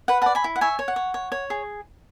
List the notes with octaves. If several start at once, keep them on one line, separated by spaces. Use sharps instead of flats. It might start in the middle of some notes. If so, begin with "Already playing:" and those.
B4 F#5
F#5 A5
D5
G#5 B5
E4
F#5
C#5 E5 G#5
C#5
F#5
C#5
C#5
C#5
G#4